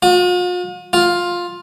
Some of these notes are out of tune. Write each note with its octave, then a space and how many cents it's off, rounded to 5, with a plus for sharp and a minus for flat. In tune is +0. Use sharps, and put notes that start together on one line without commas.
F4 +45
F4 +10